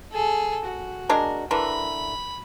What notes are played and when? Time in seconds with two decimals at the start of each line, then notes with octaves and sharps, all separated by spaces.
0.13 G#4 A4
0.65 F#4
1.09 G#3 D4 A#4
1.51 D3 E3 A#4 B5